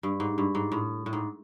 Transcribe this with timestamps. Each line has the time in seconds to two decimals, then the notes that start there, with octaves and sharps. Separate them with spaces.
0.03 G2
0.20 G#2
0.38 G2
0.55 G#2
0.72 A2
1.06 A2
1.13 G#2